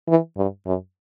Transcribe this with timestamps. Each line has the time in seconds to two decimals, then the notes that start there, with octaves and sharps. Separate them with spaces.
0.09 E3
0.37 G2
0.66 F#2